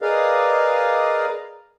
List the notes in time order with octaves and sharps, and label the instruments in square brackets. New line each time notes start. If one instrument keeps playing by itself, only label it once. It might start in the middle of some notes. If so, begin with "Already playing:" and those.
[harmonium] G#4 A#4 B4 D5 D#5 F5